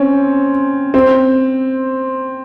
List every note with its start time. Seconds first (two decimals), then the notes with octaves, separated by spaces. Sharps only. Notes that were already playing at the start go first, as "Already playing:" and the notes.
Already playing: C4 C#4
0.94 C4